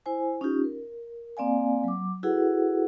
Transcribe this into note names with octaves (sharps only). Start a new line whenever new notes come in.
E4 C5 G#5
C#4 D#4 F4 G4
A#4
A#3 C4 D5 F5 G#5
F#3 D6
E4 F#4 G#4 A4 B4 F#5